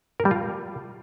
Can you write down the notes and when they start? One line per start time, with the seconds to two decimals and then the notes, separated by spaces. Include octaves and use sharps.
0.20 A#4
0.25 G3
0.31 F4